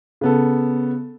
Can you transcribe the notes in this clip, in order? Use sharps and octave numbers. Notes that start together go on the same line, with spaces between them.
C#3 B3 A4